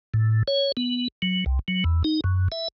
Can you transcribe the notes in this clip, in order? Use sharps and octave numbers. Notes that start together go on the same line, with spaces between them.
A2
C#5
B3
F#3
C2
F#3
E2
D#4
F#2
E5